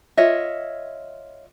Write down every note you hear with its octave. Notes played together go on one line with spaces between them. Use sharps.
F4 C#5 D#5 E5